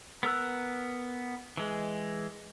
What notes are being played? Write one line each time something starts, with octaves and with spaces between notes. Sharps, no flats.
B3 A#4 E6 F#6
E3 G#3